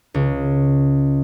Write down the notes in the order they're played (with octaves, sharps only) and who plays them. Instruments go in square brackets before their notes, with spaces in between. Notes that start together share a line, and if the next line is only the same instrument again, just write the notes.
[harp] C#2